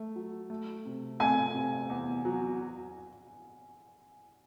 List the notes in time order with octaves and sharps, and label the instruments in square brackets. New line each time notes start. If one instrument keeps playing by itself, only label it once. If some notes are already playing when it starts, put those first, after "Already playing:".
Already playing: [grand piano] A3
F#3
A3
C3
[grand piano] A3 [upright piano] G#5
[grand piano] C3
E2
F#3